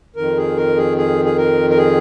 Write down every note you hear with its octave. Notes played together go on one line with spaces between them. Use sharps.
F2 D#3 A#4
G#4
A#4
G#4
G#4
G#4
A#4
A#4
G#4